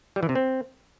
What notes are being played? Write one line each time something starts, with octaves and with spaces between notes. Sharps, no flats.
G3
E3
C3
C4